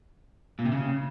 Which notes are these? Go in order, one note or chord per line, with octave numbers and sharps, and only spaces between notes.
A#2
C3
C#3